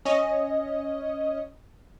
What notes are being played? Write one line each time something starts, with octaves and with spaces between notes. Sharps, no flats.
C#4 D#5